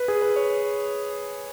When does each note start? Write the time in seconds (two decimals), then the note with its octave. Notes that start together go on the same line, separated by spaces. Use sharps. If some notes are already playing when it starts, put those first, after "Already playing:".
Already playing: B4
0.08 G#4
0.22 B4
0.36 C#5